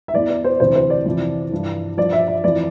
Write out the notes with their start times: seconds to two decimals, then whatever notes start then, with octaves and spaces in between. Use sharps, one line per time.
0.08 E5
0.13 E2 E3 D5
0.30 D5
0.44 C5
0.60 D2 C3 E3 C5
0.75 C5
0.90 D5
1.06 F2 C3 E3
1.51 G2 E3
1.97 G2 F3 D5
2.12 E5
2.28 E5
2.44 F2 E3 D5